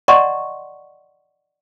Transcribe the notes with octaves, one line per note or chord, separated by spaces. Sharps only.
D5 D#5 F#5 A#5 C6 C#6